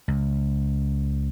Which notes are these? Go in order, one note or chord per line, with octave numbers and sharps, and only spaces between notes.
C#2